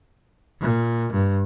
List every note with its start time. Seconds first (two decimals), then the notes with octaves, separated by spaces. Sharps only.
0.60 A#2
1.12 G2